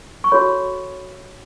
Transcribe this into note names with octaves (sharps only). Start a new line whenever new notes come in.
C#6
F#4 A4 C#5 B5